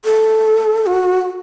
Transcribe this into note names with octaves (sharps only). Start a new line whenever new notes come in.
A4
F#4